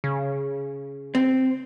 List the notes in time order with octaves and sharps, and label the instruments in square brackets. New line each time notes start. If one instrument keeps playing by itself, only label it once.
[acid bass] C#3
[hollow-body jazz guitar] C4